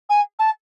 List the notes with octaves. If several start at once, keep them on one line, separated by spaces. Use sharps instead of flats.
G#5
A5